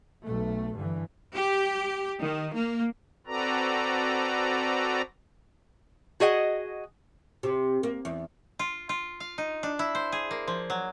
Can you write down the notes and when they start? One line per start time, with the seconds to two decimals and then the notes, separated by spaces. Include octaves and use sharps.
0.23 B1 A3
0.74 G2 D3 E3
1.34 G4
2.22 D#3
2.54 A#3
3.27 C4 F#4 A4 B4 D5 A#5
6.20 F#4 G#4 D#5 F#5
7.43 C3
7.83 A#3
8.05 E2
8.59 F4
8.89 F4
9.20 F5
9.38 D#4
9.63 D4
9.79 E4
9.95 C5
10.12 G#4
10.31 A#3
10.48 F3
10.70 F#3